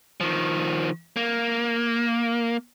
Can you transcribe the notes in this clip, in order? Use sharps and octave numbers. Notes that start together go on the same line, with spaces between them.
D#3 F3
A#3